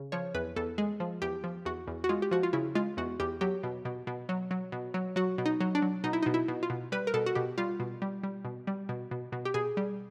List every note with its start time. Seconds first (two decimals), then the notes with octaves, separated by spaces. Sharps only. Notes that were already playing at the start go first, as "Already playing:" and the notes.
Already playing: C#3
0.12 F3 C#5
0.34 E2 B4
0.56 E2 A4
0.78 G#3 G#4
1.00 F3
1.22 E2 G4
1.44 F3
1.65 E2 F#4
1.87 E2
2.04 F#4
2.09 G#3 F4
2.22 G4
2.31 F3 F#4
2.43 F4
2.53 C#3 E4
2.75 G#3 F4
2.97 E2 F#4
3.20 E2 G4
3.41 F#3 G4
3.63 B2
3.85 B2
4.07 B2
4.29 F#3
4.51 F#3
4.72 B2
4.94 F#3
5.16 F#3 F#4
5.38 B2
5.46 D#4
5.60 F#3
5.75 D4
5.82 F#3
6.04 B2 D#4
6.13 E4
6.23 B2 D#4
6.34 E4
6.48 B2
6.63 F4
6.70 B2
6.92 G3 B4
7.07 A#4
7.14 B2 A4
7.26 F#4
7.35 B2 G4
7.58 G3 F4
7.80 B2
8.02 G3
8.23 G3
8.45 B2
8.67 G3
8.89 B2
9.11 B2
9.32 B2
9.45 G4
9.54 B2 G#4
9.77 G3